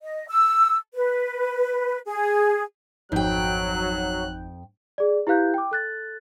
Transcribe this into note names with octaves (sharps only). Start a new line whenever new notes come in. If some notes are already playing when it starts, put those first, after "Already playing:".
D#5
E6
B4
G#4
G#1 F2 F#3 D#4 G5 F#6 G6
G#4 D5
E4 G4 B4 F5 F#6 G6
G5 D6
A4 F#6 A6